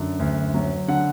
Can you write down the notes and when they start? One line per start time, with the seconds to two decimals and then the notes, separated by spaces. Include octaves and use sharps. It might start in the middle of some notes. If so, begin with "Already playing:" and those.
Already playing: F#2 D3
0.19 D2
0.54 F#3
0.88 D3 F#5